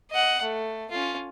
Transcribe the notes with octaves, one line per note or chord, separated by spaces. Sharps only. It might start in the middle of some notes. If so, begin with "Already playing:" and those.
D#5 F#5
A3
C#4 F4